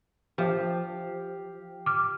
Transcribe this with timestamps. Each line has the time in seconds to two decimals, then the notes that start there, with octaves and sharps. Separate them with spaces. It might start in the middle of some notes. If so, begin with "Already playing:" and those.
0.38 F3 G4 F5
1.86 D6 F6